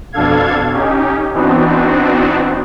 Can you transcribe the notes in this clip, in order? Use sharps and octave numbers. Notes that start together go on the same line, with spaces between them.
F2 B2 D4 A4 F5 G#6
C#4 D#4 G4
E3 B3 C4 D4 D#4 F#4